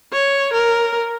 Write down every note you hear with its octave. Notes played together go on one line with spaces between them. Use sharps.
C#5
A#4